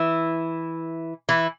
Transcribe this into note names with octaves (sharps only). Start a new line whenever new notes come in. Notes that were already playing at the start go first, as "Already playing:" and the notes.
Already playing: E3 E4
E3 E4